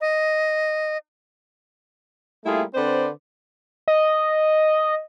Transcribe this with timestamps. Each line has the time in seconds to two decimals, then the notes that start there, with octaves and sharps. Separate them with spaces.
0.01 D#5
2.45 G3 A3 A#3 E4 F4 G#4
2.75 D3 C4 B4 C5 D5
3.88 D#5